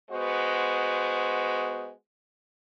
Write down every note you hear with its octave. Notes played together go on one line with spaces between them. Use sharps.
G#3 B3 F#4 C5